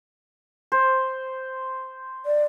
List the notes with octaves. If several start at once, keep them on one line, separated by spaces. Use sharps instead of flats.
C5
D5